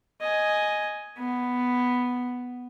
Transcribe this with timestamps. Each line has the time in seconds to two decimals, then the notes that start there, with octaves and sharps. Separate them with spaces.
0.21 D#5 G#5
1.18 B3